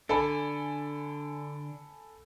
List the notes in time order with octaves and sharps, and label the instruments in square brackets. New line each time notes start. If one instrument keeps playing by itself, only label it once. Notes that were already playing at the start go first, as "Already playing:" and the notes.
[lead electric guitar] D3 D4 [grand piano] A4 G#5 B5